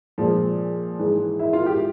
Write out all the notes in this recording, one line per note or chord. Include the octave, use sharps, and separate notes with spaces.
A#2 F3 G#3
G#2 E3 G#3
E4
F4
G4